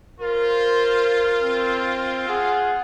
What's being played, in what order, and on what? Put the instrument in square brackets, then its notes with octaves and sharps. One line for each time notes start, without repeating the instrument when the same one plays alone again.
[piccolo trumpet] F4 [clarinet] A#4 [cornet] C5
[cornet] C4
[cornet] G#4 [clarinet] F#5